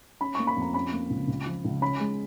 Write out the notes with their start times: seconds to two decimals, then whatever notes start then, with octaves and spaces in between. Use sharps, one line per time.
0.21 C#4 B5
0.35 A#3 C#6
0.47 B5
0.56 F2
0.62 A#5
0.74 C#4 B5
0.93 A#3
1.10 C#2
1.28 C#2
1.46 F3
1.64 C#2
1.81 C#4 B5
2.00 G#3